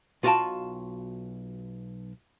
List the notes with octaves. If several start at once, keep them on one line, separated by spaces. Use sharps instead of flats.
B1 F4 F#4 F5 G5 A5